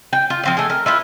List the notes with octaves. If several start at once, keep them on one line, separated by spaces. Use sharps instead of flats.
G5
F4
F3 C4 F5
A3 G#4
A#4
E4 F4 B4